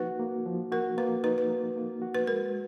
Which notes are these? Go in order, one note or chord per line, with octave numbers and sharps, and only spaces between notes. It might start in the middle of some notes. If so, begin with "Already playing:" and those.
Already playing: F3 A#3 D#4 F#4 B4
A#3
F3
F#4 A#4
A#3 B4
D#4 B4
B4
A#3
A#3
F#4
B4
G#3 A#4